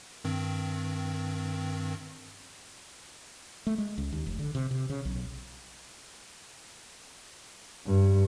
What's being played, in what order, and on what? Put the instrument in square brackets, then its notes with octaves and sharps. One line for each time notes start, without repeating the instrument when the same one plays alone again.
[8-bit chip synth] G2 D#3 C4
[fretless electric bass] A3
G#3
C#2
D#2
F1
D3
C3
C3
C#3
B1
[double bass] G2